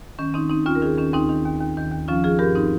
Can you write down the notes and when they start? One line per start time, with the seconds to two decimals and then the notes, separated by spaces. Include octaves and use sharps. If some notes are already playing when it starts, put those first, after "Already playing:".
0.19 D#3 C#4
0.34 D#3 C4 D#4
0.50 D#3 C4 D#4
0.66 D#2 C#4 F4
0.75 A#4
0.82 D#3 F4 G#4
0.98 D#3 C#4
1.13 D#2 C4 D#4
1.29 D#3
1.45 D#2
1.61 D#2
1.77 D#3
1.92 D#2
2.08 F3 C#4 F4
2.24 F3 F4 G#4
2.39 G2 G4 A#4
2.55 C4 D#4